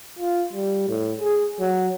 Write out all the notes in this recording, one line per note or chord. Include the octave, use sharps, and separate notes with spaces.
F4
G3
A2
G#4
F#3